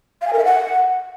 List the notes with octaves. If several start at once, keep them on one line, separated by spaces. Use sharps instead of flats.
F5
G#5
A#4
E5
F#5